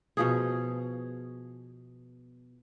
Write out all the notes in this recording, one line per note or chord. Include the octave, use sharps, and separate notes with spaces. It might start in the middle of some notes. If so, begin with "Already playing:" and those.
B2 F3 G#4